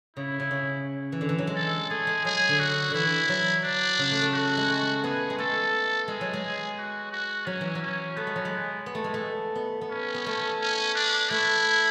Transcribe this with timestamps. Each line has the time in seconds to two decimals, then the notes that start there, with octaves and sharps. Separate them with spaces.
0.17 C#3 E4
0.40 C#3
0.51 C#3
1.12 E3
1.21 D3
1.29 E3
1.38 F#3
1.47 G#3
1.55 A4
1.90 A3 G#4
2.07 G#3
2.25 F#3 G#4
2.49 D3
2.59 F#4
2.91 D3 E3 E4
3.29 F#3
3.64 D4
3.99 C#3
4.11 A3
4.22 A3
4.34 F#4
4.57 G#3
4.69 A3
5.04 B3 G#4
5.30 G#3
5.38 A3 A4
6.08 G#3 G#4
6.21 F#3
6.33 G#3
6.78 F#4
7.12 F#4
7.47 F#3 C#4
7.61 E3
7.75 F#3
7.82 C#4
8.17 A3 B3
8.27 G#3
8.36 F#3
8.45 G#3
8.86 B3
8.95 A3
9.04 G#3
9.14 A3
9.55 B3
9.81 B3
9.91 C#4
10.14 B3
10.26 A3
10.60 C#4
10.95 D4
11.30 A3 E4